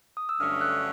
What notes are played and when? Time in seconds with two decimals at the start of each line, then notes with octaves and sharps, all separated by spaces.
0.17 D#6
0.29 E6
0.40 G2 D3 F#3 A3 C#4 D#6 F6
0.61 E6 F#6